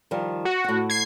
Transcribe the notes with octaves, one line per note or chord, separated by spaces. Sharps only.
D#3 F3 G3
F#4
A2 F#5
G#6 C7